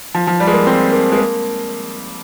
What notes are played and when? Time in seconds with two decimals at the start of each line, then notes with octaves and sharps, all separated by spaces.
0.14 F3
0.27 F3
0.40 G3
0.47 G#3
0.53 A#3
0.67 C4
0.92 A#3
1.12 G#3
1.18 A#3